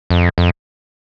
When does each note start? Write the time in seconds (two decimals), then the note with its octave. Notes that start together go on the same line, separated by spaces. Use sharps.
0.10 F2
0.38 F2